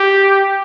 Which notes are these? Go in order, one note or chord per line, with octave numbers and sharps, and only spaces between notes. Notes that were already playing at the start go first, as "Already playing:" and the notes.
Already playing: G4